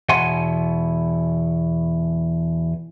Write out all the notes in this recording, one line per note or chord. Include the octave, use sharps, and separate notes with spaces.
E2 B2 F#5 G#5 C6